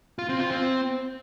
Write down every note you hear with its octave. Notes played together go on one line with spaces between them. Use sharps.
F4
C4
F4
C4